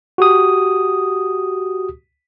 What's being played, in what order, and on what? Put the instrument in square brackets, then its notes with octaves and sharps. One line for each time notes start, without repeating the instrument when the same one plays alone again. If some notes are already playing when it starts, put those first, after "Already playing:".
[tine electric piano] F#4 G4 D#6